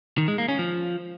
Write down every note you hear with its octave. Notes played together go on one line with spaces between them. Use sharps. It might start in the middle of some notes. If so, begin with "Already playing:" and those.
D#3
G#3
A#3
C#4
F3